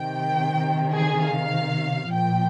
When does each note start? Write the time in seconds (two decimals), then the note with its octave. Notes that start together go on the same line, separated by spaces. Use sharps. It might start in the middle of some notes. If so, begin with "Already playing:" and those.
Already playing: C3 D#3 G5
0.93 G#4
1.22 F5
2.12 A#2 F3 G5